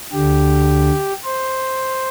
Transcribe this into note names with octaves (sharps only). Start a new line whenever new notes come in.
D2 D3 G4
C5